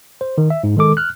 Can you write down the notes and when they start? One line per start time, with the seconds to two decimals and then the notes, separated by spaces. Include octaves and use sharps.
0.21 C5
0.38 D#3
0.50 E5
0.64 G#2
0.77 D#3 G#3 A4 D6
0.97 F6 F#6